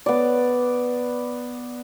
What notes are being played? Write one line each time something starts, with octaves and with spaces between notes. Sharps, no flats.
B3 D5